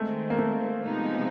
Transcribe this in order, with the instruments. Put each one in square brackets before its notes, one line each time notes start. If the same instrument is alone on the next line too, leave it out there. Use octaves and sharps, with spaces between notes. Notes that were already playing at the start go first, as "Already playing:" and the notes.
Already playing: [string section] D#3 G#3 C4 [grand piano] A3
[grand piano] A#3
A3
[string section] C3 F3 G#3 B3 D#4